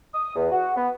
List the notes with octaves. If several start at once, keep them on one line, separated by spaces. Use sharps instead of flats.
D#6
E2
F#4
B3